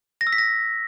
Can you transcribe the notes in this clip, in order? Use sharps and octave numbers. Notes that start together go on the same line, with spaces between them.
A#6
E6
B6
A#6